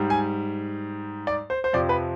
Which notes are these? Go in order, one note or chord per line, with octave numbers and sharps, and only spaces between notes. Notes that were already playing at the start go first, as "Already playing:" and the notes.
Already playing: G#2 G3
G#5
D5
C5
C5
F2 C3 F3 D5
B4